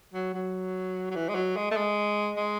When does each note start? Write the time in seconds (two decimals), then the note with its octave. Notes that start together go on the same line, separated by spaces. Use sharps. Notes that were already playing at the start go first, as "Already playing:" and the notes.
0.13 F#3
0.34 F#3
1.10 F#3
1.15 E3
1.29 G#3
1.35 F#3
1.56 G#3
1.71 A3
1.76 G#3
2.36 G#3